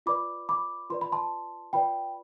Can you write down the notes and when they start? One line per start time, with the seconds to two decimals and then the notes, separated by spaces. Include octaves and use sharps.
0.06 F4 B4 D5 B5 D6
0.49 B5 D6
0.90 F4 B4 D5 C6
1.01 B5
1.12 A5 C6
1.73 F4 B4 D5 G5 B5